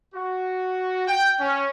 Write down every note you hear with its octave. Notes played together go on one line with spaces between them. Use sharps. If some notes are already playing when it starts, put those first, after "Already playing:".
F#4
G5
C#4